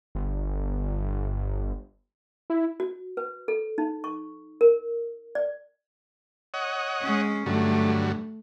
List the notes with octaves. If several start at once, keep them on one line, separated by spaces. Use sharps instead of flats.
G1
E4
F#4
B4
A4
D#4
C#6
A#4
D5
C#5 D#5 F#5
G#3 C#4
G2 D3 F#3 A3